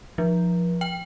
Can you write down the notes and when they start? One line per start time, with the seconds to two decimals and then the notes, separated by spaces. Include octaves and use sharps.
0.18 F3
0.81 G5